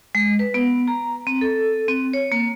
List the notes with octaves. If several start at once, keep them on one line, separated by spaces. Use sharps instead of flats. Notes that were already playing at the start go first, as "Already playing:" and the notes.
G#3
B4
B3
A#5
C4
A4
C4
C#5
A#3